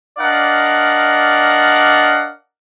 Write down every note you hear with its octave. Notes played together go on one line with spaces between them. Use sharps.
D4 A#4 D5 D#5 F5 F#5